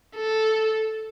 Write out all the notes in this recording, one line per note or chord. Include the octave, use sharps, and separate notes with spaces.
A4